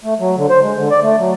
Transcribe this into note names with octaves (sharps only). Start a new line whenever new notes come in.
A3
F#3
D3
C5
G#3
D3
D5
A3
F#3